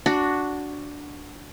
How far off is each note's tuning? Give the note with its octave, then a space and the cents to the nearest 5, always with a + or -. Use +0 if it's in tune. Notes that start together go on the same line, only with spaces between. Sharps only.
D4 -5 F#4 +0